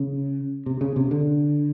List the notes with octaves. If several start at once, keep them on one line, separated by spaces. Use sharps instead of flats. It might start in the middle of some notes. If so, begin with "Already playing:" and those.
Already playing: C#3
C3
C#3
C3
D3